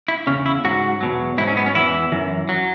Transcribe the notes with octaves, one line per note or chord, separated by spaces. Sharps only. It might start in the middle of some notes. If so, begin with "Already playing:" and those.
E4
E2 C#3 C#4
E4
G#2 F#3 F#4
E2 B2 F#3
G#2 F#3 E4
C#4
B3
C#4
E2 E3 E4
F#2 E3
F#3